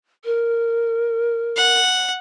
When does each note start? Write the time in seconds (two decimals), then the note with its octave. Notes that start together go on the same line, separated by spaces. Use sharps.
0.25 A#4
1.57 F#5